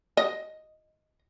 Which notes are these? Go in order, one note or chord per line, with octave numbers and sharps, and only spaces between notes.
D#5